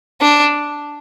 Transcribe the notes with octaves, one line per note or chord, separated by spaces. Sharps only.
D4